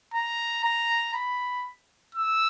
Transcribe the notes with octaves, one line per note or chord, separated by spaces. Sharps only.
A#5
A#5
B5
E6